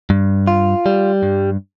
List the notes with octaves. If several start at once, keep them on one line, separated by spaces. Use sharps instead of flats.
G2
F4
G3
G2